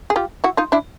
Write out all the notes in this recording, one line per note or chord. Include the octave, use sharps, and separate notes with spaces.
G#4
F4 G4
E4 F#4
D#4 F4
D4 E4